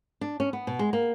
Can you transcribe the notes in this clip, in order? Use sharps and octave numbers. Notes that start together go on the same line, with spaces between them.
D4
C#4
B3
B2
G#3
A#3